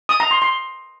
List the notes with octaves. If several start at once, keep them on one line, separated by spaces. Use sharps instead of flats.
D#6
A#5
C6
C6